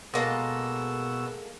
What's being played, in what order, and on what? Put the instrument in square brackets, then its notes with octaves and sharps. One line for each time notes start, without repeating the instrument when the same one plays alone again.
[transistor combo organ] B2 E6 [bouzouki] G#3 A#3 A4